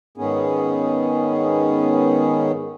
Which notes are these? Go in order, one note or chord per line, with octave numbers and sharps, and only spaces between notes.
G#2 D#3 B3 C#4 G#4